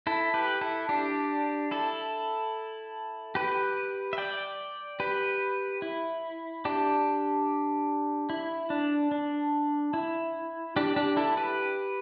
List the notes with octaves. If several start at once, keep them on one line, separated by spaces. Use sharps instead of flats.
E4 A4
G4 B4
E4 A4
D4 G4
E4 A4
G4 B4
E5
D5 G5
G4 B4
E4
D4 G4
E4
D4
D4
E4
D4 G4
D4 G4
E4 A4
G4 B4